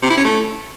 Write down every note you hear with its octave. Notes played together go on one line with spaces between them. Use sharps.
C3
E4
C#4
A3